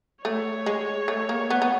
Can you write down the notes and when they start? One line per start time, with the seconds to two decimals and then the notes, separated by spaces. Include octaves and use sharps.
0.24 A3 C#5
0.66 G#3
1.08 A3
1.29 A#3
1.50 B3
1.62 B3